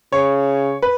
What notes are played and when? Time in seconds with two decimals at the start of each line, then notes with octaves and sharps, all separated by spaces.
0.12 C#3 C#5
0.82 B4